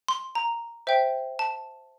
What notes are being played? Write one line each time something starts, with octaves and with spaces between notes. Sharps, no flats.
C6
A#5
C5 E5 G5
A5